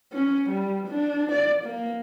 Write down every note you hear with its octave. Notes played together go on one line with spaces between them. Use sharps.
C#4
G3
D4
D5
A#3